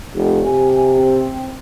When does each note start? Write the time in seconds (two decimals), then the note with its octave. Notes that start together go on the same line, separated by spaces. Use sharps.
0.14 F1
0.44 C3 G#5
0.95 C4